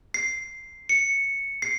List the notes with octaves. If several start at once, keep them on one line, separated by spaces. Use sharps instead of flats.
C7
C#7
C7